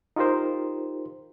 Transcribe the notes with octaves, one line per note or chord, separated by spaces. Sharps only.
D#4 F4 G4 A#4 C5